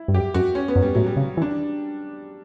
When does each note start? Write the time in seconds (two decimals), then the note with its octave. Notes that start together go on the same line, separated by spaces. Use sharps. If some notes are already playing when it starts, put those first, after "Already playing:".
Already playing: E4
0.08 G2
0.14 F#2 G4
0.34 F#2 F#4
0.55 C#4
0.68 B3
0.76 F#2
0.82 G3
0.95 A2 F#3
1.07 G3
1.17 C#3
1.37 E3
1.42 D4